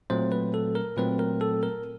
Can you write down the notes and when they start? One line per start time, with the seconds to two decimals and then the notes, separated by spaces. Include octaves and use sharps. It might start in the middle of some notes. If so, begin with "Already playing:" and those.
0.10 A#2 F#3 A3 C4 C5
0.32 B4
0.54 A4
0.75 A#4
0.97 A#2 F#3 A3 C4 B4
1.19 A#4
1.41 A4
1.63 A#4